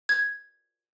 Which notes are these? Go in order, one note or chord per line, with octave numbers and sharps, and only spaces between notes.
G#6